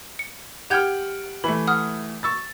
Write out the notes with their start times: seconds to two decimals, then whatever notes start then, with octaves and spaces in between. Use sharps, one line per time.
0.19 C#7
0.70 G4 F#5 G5 F6 G6 G#6
1.44 E3 A3 B5
1.67 F#5 D#6 F6
2.23 C#6 E6 A6